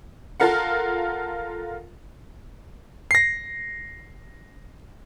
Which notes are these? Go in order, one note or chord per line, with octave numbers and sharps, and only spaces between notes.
F4 A4 A#4 F5 F#5
A#6 C7